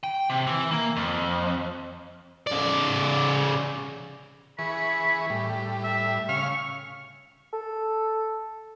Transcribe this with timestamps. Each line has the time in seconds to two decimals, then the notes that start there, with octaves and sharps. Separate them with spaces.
0.04 G5
0.30 C3
0.47 E3
0.71 A#3
0.97 F2
2.47 C#3 D5
4.59 E3 G#4 B5 C#6
5.30 A2 G3
5.84 E5
6.29 C#3 F5 C#6 F6
7.53 A4